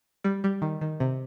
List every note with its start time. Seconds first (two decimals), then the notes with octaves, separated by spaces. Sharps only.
0.24 G3
0.44 G3
0.62 D#3
0.81 D#3
1.00 C3